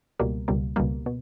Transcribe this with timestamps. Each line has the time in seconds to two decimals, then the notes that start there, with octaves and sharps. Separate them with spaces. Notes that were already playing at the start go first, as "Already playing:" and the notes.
0.19 C#2 B2 G3 A#3
0.48 C#2 B2 G3 A#3
0.76 C#2 B2 G3 A#3
1.06 B2